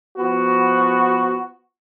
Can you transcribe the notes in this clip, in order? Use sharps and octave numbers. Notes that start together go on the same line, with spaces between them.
F3 B3 F#4